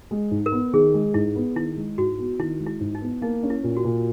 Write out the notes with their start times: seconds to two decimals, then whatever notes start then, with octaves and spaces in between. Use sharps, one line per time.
0.11 G#3
0.31 G#2
0.46 A#4
0.52 B3
0.73 D#3 G#4
0.94 G#3
1.14 G#2 E4
1.36 B3
1.55 D#3 E4
1.77 G#3
1.98 G#2 F#4
2.18 B3
2.39 D#3 E4
2.60 G#3
2.66 E4
2.80 G#2
2.95 D#4
3.01 B3
3.22 A#3 D#4
3.43 C#4
3.50 E4
3.64 A#2
3.77 F#4
3.85 A#2